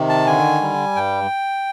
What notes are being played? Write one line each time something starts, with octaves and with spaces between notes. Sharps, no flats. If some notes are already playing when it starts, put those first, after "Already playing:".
Already playing: C3 D#3
A5
D3 G#5
G3
G2 G5